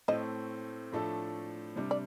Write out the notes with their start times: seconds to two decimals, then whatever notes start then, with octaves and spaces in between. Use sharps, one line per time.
0.08 A2 A3 C4 C5 D#5
0.92 A2 F3 A3 D4 A4
1.76 C3 G3 D4
1.91 D5